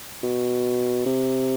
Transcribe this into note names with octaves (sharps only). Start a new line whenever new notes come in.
B2
C3